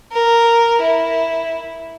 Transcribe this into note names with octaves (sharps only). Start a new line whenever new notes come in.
A#4
E4